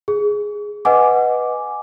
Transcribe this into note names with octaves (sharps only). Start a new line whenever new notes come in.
G#4
B4 D#5 F#5 G#5 D6